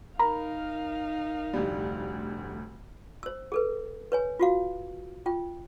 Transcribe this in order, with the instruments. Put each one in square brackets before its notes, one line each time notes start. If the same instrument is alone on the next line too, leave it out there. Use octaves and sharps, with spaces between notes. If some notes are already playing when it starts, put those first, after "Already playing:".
[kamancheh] D#4 F5 [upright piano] A#4 [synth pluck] A#5 B5
[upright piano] F1 D2 G3
[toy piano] C5 E6
G#4 A4 B4
B4 C#5 G#5
F4 F#4 F5
F4 G5